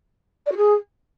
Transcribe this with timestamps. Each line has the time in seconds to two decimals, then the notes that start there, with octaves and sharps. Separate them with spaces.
0.46 D5
0.52 F#4
0.57 G#4